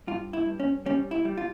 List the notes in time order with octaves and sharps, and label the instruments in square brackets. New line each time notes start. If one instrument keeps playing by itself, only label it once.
[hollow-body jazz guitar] G2 F4
E4
G2
C#4
G3 C#4
E4
G3
F4